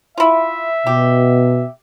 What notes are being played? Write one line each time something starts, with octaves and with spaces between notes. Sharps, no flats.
E4 F4 E5
B2 G4